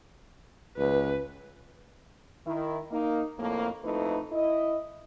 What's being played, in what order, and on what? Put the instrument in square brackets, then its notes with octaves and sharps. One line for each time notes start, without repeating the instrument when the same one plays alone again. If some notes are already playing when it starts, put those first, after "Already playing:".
[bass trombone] C#2 [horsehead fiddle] B4
[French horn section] D#3 E4
A#3 D#4
F2 A2 A#3
F2 A3 D#4 E4 B4
E4 D#5